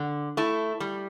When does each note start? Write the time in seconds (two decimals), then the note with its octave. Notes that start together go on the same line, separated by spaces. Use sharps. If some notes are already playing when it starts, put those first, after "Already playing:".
Already playing: D3
0.37 A3 E4
0.80 G3